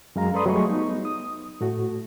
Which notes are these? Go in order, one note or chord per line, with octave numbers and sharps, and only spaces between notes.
F#2 G#3 F5 A#5
A4 B4 D5 B5 C6 D#6
F#3 G3 A3 G#4 D#5 C#6
B3 D#4
D#6
A2 A3 F#4